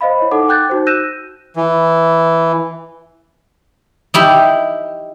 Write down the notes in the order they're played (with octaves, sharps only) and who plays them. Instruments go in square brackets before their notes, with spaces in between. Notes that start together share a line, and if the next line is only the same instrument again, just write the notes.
[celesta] C5 D#5 F5 B5
E4 C#5
D#4 A4 F#5 D6
G5 D6 F#6 G6 A6
D#4 F#4 C5
E6 F#6 G6 A#6 D#7 E7
[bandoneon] E3
[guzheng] D#4 E4 G4